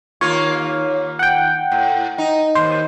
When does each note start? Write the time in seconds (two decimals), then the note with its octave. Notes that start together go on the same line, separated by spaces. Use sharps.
0.21 D#2 A#3 F4 C#5
1.19 F#5 G5
1.72 A2
2.18 D#4
2.55 D#2 C5